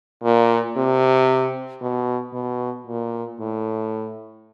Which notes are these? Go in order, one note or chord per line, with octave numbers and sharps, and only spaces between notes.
A#2
C3
B2
B2
A#2
A2